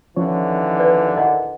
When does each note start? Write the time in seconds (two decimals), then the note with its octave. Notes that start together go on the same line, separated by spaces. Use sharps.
0.16 D#2 D3 E3 F3 C#4 C#5
0.79 B4 D5
1.17 A#4 D#5 F#5